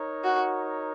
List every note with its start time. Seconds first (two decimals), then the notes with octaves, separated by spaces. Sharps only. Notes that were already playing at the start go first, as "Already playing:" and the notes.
Already playing: D#4 A#4 C#5
0.24 F#4